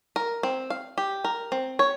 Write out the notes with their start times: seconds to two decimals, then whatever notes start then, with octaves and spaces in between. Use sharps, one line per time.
0.16 A#4
0.43 C4
0.70 F5
0.98 G4
1.24 A#4
1.52 C4
1.79 C#5